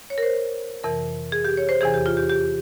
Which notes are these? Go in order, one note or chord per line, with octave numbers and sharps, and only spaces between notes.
C#5
A#4
C5
F2 C3 E3 A#4
G#4
G4
C#5
C5
E2 C3 E3 G#4
G4
F4
G4
G4